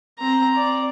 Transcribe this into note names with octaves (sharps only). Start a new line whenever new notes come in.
C4 A#5
D5